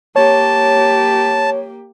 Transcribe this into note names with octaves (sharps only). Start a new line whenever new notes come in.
A#3 G4 C#5 A5